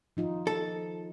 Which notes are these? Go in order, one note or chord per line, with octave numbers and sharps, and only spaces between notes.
F3 D#4 F4
A4